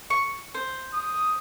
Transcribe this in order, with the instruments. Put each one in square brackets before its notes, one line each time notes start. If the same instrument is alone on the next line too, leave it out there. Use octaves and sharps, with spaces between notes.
[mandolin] C#6
C5
[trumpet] D#6